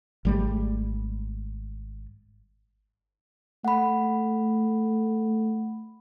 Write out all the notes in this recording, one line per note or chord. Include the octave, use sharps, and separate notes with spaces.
G#1 G3 A3
A3 F#5 B5